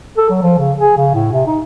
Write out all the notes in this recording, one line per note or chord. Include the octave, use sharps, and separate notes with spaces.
A4
F#3
F3
C#3
G#4
C#3
A2
C3
D#4